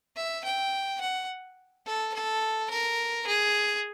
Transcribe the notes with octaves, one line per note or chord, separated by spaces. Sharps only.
E5
G5
F#5
A4
A4
A#4
G#4